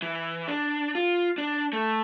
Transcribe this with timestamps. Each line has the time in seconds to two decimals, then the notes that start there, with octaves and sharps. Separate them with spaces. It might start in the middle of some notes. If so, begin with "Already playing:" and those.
0.02 E3
0.48 D4
0.95 F4
1.38 D4
1.73 A3